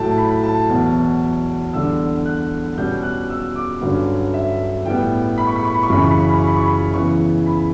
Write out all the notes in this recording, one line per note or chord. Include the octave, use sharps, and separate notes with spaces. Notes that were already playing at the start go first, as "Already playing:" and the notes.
Already playing: A2 F#3 A3 A5
B5
A5
E2 B2 F#3
E2 D3 G3 D4 E6
F#6
B2 G3 C#4 G6
F#6
E6
D6
G2 D3 F#3 C#4
E5
A2 G3 B3 G5
B5
C#6
B5
C#6
B5
C#6
F#2 C#3 E3 B5
C#6
B5
C#6
B5
C#6
B5
C#6
B5
C#3 E3 B3 C#6
B5